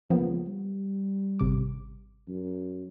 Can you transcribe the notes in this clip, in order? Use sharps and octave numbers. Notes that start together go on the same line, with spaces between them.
C#2 F3 A#3 B3
G3
G#1 C3 D6
F#2